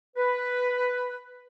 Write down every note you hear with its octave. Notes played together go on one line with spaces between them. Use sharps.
B4